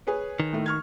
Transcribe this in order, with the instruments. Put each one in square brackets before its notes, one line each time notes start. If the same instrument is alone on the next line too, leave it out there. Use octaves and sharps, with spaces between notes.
[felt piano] G#4 B4 C#5
[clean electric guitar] D#3
[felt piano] A2 A3
C#6 F6 G#6